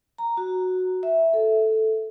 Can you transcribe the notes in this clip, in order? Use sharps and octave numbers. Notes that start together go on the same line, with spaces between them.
A#5
F#4
E5
A4